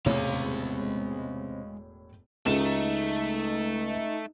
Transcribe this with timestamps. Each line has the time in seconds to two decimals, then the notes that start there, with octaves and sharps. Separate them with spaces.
0.06 E1 A2 C3 G#3 B3 C#5 F5
2.46 C#2 A3 D#4 E7